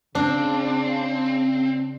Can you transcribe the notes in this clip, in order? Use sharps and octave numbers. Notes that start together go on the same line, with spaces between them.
C#3 C4 D4